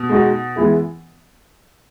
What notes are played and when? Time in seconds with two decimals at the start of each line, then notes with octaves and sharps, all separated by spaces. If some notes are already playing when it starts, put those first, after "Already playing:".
Already playing: B2
0.09 G#3 D#4 F#4
0.56 E3 G#3 B3 E4 G#4